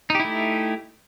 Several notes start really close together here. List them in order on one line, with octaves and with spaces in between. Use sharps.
D#4 G4 E4 A3